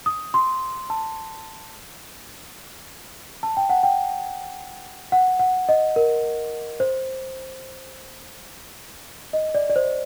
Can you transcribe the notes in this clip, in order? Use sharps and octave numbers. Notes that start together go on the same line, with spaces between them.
D#6
C6
A5
A5
G5
F#5
G5
F#5
F#5
D#5
A#4
C5
D#5
D5
D5
C5